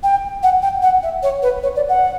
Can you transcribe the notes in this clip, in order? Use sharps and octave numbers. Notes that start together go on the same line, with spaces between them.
G5
F#5
G5
F#5
E5
C#5
B4
C#5
D5
F#5